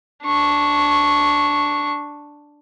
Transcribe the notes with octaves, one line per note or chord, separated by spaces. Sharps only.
D4 C#6